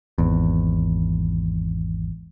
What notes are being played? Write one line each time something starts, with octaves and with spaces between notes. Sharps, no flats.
G#1 E2